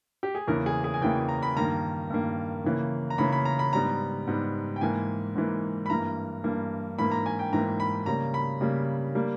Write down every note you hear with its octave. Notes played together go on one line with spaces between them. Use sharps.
G4
G#4
E2 C#3 E3 A#3 A#4
G#4
G#4
G#5
E2 C#3 E3 A#3 G5
A#5
B5
G2 D#3 A#3 A#5
G2 D#3 A#3
C#3 E3 A#3
A#5
C#3 E3 A#3 B5
B5
A#5
B5
G#2 G3 B3 A#5
G#2 G3 B3
G5
G#2 E3 A#3 G#5
G#2 E3 A#3
B5
G2 E3 A#3 A#5
G2 E3 A#3
G#2 E3 A#3 B5
A#5
G#5
G5
G#2 E3 A#3 A#5
B5
C#3 G3 A#3 A#5
B5
C#3 G3 A#3
G3 A#3